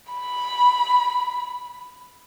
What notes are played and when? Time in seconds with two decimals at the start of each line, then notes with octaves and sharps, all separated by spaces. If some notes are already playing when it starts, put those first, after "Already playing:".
0.13 B5